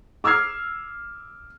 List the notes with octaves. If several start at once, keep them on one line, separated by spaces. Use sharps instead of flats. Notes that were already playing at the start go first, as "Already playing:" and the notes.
D6 E6 F6 G#6 C7